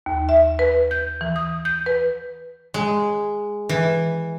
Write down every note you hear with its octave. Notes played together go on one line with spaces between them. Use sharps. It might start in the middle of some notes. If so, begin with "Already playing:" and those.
D#2
E5
B4
G6
E3
D#6
G6
B4
G#3
E3